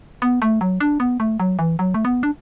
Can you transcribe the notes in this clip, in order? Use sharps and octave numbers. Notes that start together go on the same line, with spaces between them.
B3
A3
F#3
D4
B3
A3
F#3
E3
F#3
A3
B3
D4